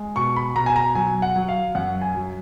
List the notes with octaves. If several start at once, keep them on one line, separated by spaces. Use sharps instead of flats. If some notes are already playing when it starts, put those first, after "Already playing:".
Already playing: G#3
B2 C#6
B5
B2 A#5
G#5
A#5
F#3 G#5
F#5
F#3
F5
F#2 F#5
G#5
F#3